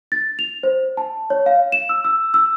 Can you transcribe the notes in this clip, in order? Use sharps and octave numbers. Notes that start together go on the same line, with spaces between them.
A6
F7
C5
A5
C#5
F5
E7
E6
E6
E6